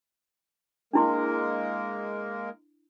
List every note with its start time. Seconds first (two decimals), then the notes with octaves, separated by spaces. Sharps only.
0.93 G#3 A#3 D4 E4 A#4 C6